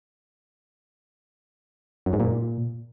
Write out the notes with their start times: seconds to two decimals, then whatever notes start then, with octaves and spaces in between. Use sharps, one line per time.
2.06 F#2
2.13 G#2
2.20 A#2